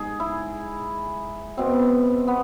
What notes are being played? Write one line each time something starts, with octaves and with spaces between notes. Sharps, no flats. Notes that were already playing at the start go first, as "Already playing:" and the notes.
Already playing: G#2 G#4
E4
B2 C4
B3